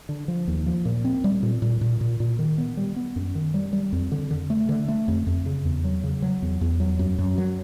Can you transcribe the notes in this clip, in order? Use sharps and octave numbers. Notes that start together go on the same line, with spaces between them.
D3
F3
D#2
F3
A#2
C4
G3
A#2
A#2
A#2
A#2
A#2
D#3
B3
G3
B3
F#2
D#3
G3
G3
F2
D3
D3
A3
D3
A3
F2
F2
C#3
E2
F#3
C#3
F#3
E2
E2
F#3
F#2
F#2
F#3